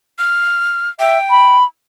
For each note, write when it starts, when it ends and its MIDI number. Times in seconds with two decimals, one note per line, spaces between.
0.19 0.89 89
0.99 1.18 76
0.99 1.56 79
1.30 1.64 83